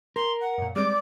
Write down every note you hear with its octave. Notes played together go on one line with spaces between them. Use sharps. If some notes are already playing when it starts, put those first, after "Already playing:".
A#4 C6
F#5
F#2 A#2
G3 G#3 C4 D5 D6